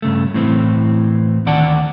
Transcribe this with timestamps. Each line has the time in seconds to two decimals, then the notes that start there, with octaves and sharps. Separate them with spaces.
0.02 G2 C#3 A3
0.34 A2 E3 C4
1.46 D2 D#3 D5 F#5 A5